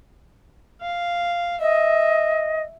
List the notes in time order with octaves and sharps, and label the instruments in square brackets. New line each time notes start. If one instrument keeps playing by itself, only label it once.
[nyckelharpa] F5
[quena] D#5 [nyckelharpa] E5